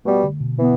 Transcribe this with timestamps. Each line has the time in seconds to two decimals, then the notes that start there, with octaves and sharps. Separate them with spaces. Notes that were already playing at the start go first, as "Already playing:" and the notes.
0.05 B2 G3 A3 B3
0.24 D3
0.40 B2
0.58 B2 E3 B3